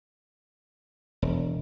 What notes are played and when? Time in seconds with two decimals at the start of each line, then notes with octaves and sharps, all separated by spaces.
1.22 E1